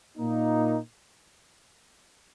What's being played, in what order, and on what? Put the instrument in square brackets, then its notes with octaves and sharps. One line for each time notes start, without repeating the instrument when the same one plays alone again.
[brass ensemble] A#2 A#3 D#4